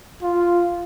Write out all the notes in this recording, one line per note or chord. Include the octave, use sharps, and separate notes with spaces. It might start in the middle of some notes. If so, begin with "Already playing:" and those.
F4